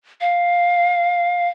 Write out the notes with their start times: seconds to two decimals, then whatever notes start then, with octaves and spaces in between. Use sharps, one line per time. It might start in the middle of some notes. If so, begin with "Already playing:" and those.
0.21 F5